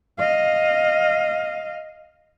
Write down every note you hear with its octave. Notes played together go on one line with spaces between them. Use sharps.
D#5 F5